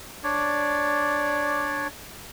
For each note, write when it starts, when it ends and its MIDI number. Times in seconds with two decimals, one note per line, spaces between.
0.24 1.88 62
0.24 1.88 73
0.24 1.88 74